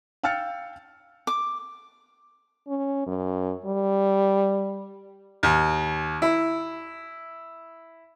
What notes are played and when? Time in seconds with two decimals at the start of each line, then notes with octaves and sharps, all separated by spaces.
0.23 F5 G5 E6 F6 A6 C#7
1.27 D6
2.68 C#4
3.07 F#2
3.66 G3
5.43 D#2
6.22 E4